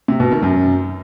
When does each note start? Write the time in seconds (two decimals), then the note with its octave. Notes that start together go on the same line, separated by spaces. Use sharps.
0.08 C3
0.20 B2
0.31 D#3
0.43 F#2